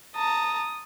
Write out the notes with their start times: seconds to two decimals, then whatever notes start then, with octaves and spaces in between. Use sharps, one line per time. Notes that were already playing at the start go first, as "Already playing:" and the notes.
0.16 A5 A#5 D#6